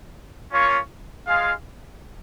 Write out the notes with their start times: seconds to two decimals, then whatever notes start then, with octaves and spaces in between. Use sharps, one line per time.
0.51 A#3 C#4 F4 C#5
1.26 G#3 F4 G#4 F5